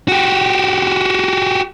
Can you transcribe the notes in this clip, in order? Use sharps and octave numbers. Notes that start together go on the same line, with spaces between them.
F#4 G4